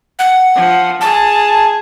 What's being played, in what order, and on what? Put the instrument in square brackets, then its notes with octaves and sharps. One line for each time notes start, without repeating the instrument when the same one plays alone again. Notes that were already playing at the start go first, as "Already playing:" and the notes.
[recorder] F#5
[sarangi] F3
[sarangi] G#4 [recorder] A5